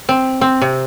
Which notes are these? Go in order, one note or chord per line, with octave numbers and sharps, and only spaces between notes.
C4
C4
C3